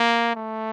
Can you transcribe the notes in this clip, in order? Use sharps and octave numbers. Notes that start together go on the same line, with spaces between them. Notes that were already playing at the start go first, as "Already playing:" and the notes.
Already playing: A#3
A3